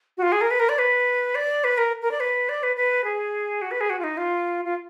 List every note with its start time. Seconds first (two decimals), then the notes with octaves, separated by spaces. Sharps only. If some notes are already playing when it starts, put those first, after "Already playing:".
0.17 F#4
0.22 F4
0.32 G#4
0.41 A#4
0.51 B4
0.60 A#4
0.69 D5
0.78 B4
1.35 D5
1.64 B4
1.78 A#4
2.02 A#4
2.11 D5
2.20 B4
2.49 D5
2.63 B4
2.76 B4
3.04 G#4
3.62 F#4
3.71 B4
3.81 G#4
3.90 F#4
3.99 F4
4.04 D#4
4.17 F4
4.65 F4